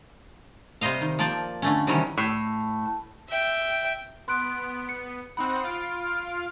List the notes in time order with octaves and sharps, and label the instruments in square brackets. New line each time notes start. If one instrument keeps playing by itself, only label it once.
[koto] C3 G3 C5 D#5 F5
D#3
F3 A#3 D5 G5 A5
D3 A3 C#4
C3 D#3 E3 F#3 G3 C#4
[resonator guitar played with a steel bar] A2
[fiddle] E5 G5
[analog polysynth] B3 [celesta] C6 F#6 D7
[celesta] C#7
[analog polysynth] C4 D#4 F#5 [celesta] B5
[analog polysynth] F4 F5 D7